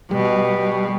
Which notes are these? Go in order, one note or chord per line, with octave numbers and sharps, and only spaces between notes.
B2 G3